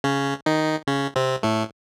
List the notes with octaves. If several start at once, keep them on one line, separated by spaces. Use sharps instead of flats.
C#3 C#4
D#3 D#4
C#3 C#4
C3 C4
A2 A3